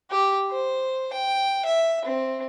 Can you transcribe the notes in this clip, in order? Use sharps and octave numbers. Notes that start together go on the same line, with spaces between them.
G4
C5
G5
E5
C4